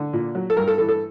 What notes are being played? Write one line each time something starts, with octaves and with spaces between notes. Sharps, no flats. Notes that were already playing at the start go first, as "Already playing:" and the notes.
Already playing: D3
A#2
F#3
A4
G2 A#4
A4
E3 A4
A4